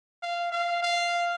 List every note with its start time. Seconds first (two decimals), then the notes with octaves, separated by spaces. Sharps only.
0.22 F5
0.52 F5
0.82 F5